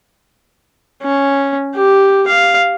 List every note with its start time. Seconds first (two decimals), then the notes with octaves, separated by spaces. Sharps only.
1.03 C#4
1.75 G4
2.27 F5